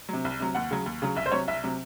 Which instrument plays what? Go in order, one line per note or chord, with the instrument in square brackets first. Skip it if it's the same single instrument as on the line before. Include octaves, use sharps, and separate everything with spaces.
[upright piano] C3 F#3
C2
C3 F#3
D#2 F#5
C#3 F#3
D#2
C#3 F#3
C2 E5
C5
C3 F#3 C#5
C2 E5
C3 F#3